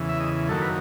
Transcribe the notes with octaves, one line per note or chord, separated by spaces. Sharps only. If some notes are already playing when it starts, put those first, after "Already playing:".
Already playing: E2 C#3 E3
E5
D#5
F#2 D#3 F#3 A#3 A4
B4